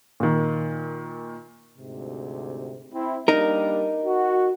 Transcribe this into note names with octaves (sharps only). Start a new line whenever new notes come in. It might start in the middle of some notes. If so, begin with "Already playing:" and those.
A#2 D#3
D2 G#2 C3
C4 E4
G3 A#3 D4 D#4 A#4
F#4